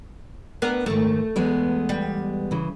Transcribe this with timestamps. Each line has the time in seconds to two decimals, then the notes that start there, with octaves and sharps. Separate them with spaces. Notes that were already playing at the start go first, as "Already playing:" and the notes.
0.62 B3 D4 A#4
0.86 G#2 D#3 A3
1.36 E2 G#3 B3
1.89 G3
2.51 C#3 E3